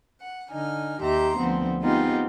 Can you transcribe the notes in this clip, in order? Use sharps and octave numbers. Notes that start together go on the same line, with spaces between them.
F#5
D3 D#4 G#5 F6
D#2 D#3 G4 E5 A#5 C6
D2 F3 B3 C4
G#3 B3 C4 D#4 F4 G4